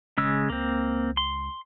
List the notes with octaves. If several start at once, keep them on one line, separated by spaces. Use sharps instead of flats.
D#1 C#3 G#3 E6
C#2 A#3 C4
C6